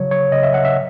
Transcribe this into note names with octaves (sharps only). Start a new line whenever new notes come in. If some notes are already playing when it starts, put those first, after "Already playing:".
Already playing: C#3 F#3 C#5
C#5
C#3 F#3 D#5
E5
F#5
E5